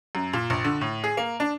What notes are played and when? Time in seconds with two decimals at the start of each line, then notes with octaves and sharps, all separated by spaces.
0.15 F#2
0.34 A#2
0.50 A#1
0.65 D3
0.81 A2
1.04 G#4
1.17 A#3
1.40 D4